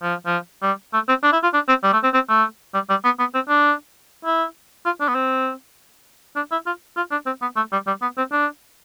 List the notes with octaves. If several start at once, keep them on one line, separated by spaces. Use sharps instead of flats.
F3
F3
G3
A3
C4
D4
E4
F4
D4
C4
G3
A3
C4
C4
A3
G3
G3
B3
B3
C4
D4
E4
F4
D4
B3
C4
D4
E4
F4
F4
D4
C4
B3
A3
G3
G3
B3
C4
D4